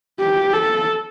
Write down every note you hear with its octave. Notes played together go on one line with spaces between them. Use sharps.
G4
A4